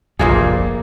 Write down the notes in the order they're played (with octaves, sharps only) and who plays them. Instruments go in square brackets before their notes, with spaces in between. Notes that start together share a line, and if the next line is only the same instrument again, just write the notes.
[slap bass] F1 A#1 F2 [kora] A#2 A#3 G#4